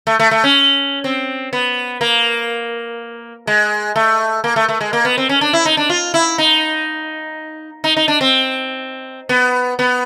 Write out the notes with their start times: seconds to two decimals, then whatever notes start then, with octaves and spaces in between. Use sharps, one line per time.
0.07 A3
0.19 A3
0.31 A3
0.44 C#4
1.04 C4
1.53 B3
2.01 A#3
3.47 G#3
3.96 A3
4.44 A#3
4.56 A3
4.69 A3
4.81 G#3
4.93 A#3
5.05 B3
5.18 C4
5.29 C#4
5.41 D4
5.53 E4
5.65 D#4
5.77 D4
5.90 F4
6.14 E4
6.38 D#4
7.84 D#4
7.97 D#4
8.08 D4
8.21 C4
9.29 B3
9.79 B3